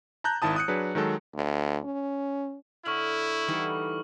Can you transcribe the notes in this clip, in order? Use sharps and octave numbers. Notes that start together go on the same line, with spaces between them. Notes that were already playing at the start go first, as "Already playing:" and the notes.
A5 A#5 F#6 G6
G#1 D#3 E4 A5 D#6
D#6 F#6 C#7
F#3 D4 G#4 B4
D#3 F#3 G#3 A4
D2
C#4
D3 E4 C#5 B5 C#6 F6 F#7
E3 G3 A3 D#4 A4 F#5